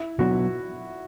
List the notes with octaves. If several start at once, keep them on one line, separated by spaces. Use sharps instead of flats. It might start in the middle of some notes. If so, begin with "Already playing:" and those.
Already playing: E4
B2 F#3 B3 D4 F#4